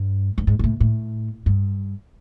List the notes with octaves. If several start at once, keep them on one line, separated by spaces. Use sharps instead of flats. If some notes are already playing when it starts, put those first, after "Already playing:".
Already playing: G2
G2
G#2
A#2
A2
A2
G2